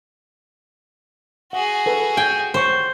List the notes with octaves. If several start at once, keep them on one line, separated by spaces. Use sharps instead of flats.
F#4 G#4 F#5
A4 B4
G5 G#5
C5 C#5 G5 C#6